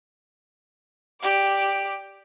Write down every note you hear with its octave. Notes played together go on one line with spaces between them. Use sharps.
G4 D5